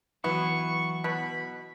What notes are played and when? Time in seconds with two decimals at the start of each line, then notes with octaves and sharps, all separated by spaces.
0.24 E3 F#3 B3 E4 C#6
1.04 B2 B5